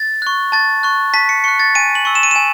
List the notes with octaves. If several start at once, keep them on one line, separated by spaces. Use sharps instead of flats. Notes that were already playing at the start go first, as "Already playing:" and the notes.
Already playing: A6
C#6 F#6
A5 A6
C#6 F#6
A5 B6
C#7
C#6 F#6 C#7
A6
G#5 D#7
F#7
C#6 E6
E7
D#7
G#5 E7